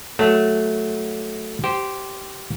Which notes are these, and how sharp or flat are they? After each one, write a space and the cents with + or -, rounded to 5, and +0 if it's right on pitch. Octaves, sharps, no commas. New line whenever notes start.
F#3 +0 A3 -5
G4 -15 C5 -5